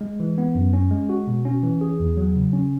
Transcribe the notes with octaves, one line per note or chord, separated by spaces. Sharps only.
G#3
E3
B3
F#2
C#4
G#3
F#4
B2
C#4
E3
G#4
E2
F#3
C#3
C#4